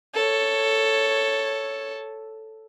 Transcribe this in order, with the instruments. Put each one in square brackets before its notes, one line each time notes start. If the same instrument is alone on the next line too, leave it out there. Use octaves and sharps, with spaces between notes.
[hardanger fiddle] A4 C#5